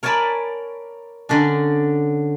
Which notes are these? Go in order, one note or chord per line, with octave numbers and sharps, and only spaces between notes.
A#4 C#5 D5 G#5 A5 B5
D3 C#4 D4